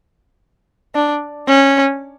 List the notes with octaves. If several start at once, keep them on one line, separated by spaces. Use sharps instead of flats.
D4
C#4